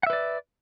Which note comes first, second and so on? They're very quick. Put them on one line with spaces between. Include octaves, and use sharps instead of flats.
F#5 E5 B4 D5